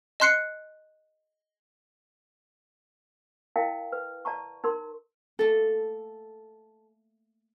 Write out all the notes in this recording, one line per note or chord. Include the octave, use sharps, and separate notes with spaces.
D#5 A5 C6 F#6 C7 C#7
E4 A#4 D#5 F5 G5 A5
B4
D5 A5 A#5 C#6
D#4 A#4 C6
A3 A#3 A4